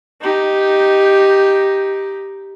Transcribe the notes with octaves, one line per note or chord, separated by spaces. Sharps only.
D#4 G4